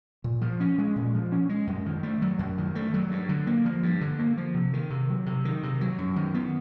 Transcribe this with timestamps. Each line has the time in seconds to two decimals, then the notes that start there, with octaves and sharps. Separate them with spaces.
0.24 A#2
0.41 F3
0.60 C#4
0.78 G#3
0.96 A#2
1.14 F3
1.32 C#4
1.49 G#3
1.67 F#2
1.86 D#3
2.03 A3
2.22 F#3
2.39 F#2
2.58 D#3
2.75 A3
2.94 F#3
3.11 G2
3.29 D3
3.47 A#3
3.65 F3
3.83 G2
4.01 D3
4.19 A#3
4.37 F3
4.54 C3
4.73 D#3
4.90 C3
5.09 F#3
5.26 C3
5.45 D#3
5.63 C3
5.81 F#3
5.98 F#2
6.16 D#3
6.34 B3